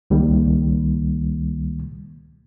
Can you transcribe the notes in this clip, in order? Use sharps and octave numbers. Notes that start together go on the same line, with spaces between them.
C#2 D#3 G3 A#3